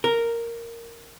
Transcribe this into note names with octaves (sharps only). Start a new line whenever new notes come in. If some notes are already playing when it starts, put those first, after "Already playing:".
A#4